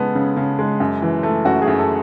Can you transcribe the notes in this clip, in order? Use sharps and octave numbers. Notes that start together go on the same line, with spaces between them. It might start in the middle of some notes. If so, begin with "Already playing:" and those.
Already playing: C#3 G#3 B3 A4
C#3
C#3
G#3
F#2
E3
A3
F#2 F#4
G#4
F#2
A4